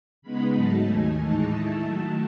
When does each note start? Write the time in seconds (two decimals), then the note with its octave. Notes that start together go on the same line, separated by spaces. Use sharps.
0.22 C#3 G#3 B3 D#4 B5
0.54 G#2 F#3 A3 D#4 A5
0.87 D#2 D#3 A3 G#5
1.18 A2 E3 G#3 D#4 A5
1.51 D#3 A3 E4
1.82 D#3 F#3 A3 A5